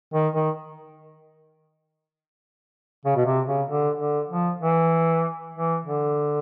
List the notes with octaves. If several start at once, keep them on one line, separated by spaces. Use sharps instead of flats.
D#3
D#3
C#3
B2
C3
C#3
D3
D3
F3
E3
E3
D3